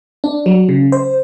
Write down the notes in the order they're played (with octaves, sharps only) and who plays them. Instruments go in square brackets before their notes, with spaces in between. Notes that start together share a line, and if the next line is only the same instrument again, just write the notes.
[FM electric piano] D4
F#3
C#3
C5